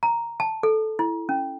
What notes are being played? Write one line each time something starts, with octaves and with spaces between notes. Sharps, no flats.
A#5
A5
A4
E4
C#4